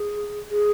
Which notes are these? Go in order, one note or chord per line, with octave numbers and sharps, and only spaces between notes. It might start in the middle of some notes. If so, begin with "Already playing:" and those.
Already playing: G#4
G#4